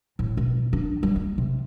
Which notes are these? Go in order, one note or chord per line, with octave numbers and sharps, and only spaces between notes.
A1
B2
D4
G3
A#3
C3